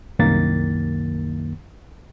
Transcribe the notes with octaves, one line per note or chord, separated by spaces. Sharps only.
C2 F#2 D#3 A#3 A6